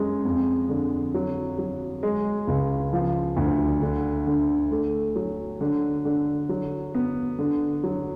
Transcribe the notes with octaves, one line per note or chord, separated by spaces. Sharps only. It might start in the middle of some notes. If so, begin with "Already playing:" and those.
Already playing: F#2 G#3
F2
D3
F#3
F#3
G#3
C#2
F3
D2
D3
D3
A3
F#3
D3
D3
F#3
B3
D3
F#3